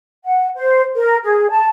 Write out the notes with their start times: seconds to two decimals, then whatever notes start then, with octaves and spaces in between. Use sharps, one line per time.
0.25 F#5
0.56 C5
0.96 A#4
1.24 G#4
1.50 A5